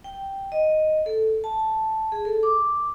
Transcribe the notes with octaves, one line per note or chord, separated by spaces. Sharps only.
G5
D#5
A4
A5
G#4
A4
D6